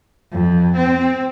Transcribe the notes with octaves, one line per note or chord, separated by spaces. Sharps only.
F2
C4